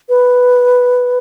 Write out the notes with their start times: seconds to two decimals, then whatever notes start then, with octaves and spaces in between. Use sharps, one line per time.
0.09 B4